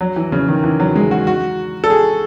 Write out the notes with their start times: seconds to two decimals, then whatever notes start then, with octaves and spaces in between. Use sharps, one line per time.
0.01 F#3
0.16 E3
0.32 C#3
0.48 D#3
0.64 E3
0.80 F#3
0.95 G#3
1.11 F#4
1.27 F#4
1.84 A4
1.90 G#4